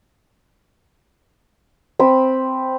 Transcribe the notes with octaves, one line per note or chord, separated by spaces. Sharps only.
C4 B5